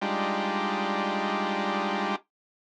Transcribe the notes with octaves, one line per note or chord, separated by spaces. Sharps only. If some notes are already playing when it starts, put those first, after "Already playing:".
G3 G#3 D4 D#4 F4 G4